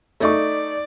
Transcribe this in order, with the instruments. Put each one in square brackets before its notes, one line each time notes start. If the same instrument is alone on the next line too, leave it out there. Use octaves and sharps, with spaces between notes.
[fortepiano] A3 D#4 C#6 [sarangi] D5